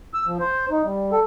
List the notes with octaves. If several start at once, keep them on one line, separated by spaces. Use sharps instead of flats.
E6
F3
C5
D#4
G3
A4